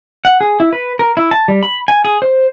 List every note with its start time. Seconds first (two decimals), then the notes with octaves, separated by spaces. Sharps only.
0.25 F#5
0.41 G#4
0.60 E4
0.73 B4
0.99 A#4
1.17 E4
1.31 A5
1.48 G3
1.63 B5
1.88 G#5
2.05 G#4
2.22 C5